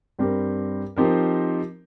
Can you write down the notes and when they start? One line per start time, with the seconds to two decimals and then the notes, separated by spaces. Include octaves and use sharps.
0.19 G2 G3 C4 G4 A#4
0.96 F3 C4 D#4 G4 A#4